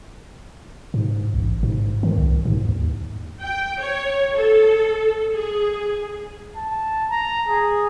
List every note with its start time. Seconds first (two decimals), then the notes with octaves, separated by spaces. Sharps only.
0.94 G#2
1.34 A1
1.63 G#2
2.03 D#3
2.16 C2
2.45 G#2
2.65 D#2
3.40 G5
3.79 C#5
4.35 A4
5.35 G#4
6.56 A5
7.11 A#5
7.49 G#4